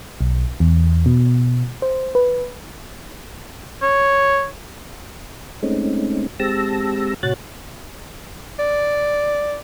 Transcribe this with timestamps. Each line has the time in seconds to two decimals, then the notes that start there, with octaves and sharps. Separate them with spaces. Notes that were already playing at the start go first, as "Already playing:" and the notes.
0.21 B1
0.60 E2
1.06 B2
1.82 C5
2.15 B4
3.82 C#5
5.63 G#3 A3 C4 C#4 D#4
6.40 G#3 C4 G4 A5 E6 A#6
7.23 A2 C3 F#4 C#5 F#6 A6
8.59 D5